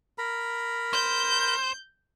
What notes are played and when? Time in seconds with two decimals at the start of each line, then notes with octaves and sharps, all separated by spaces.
0.18 A#4 A#5 B5
0.93 C5 G6